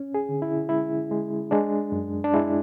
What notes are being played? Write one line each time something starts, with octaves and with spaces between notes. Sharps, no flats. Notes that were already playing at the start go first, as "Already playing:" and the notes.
Already playing: C#4
G#4
D3
E4
G#3 E4
G#3
G#3 D4
F#2
D4
G#3 E4